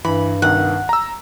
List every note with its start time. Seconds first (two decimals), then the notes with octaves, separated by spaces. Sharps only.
0.05 G2 E3 B5
0.42 C2 D#3 F#5
0.89 A#5 E6